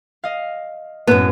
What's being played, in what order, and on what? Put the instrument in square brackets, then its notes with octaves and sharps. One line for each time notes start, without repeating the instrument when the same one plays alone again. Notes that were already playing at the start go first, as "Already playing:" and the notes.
[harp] D#5 F5
[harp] F#2 A2 [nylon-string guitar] B3